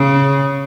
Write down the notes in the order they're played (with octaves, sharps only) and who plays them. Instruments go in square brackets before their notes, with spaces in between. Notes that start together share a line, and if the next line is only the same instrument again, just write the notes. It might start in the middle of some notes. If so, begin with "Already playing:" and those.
Already playing: [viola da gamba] C#3